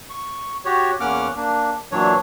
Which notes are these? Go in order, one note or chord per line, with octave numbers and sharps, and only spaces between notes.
C#6
F#4 G4 C#5
E2 A#3 C#4 F#5 D6 F6
A#3 D4
A#2 E3 F#3 D4 C#5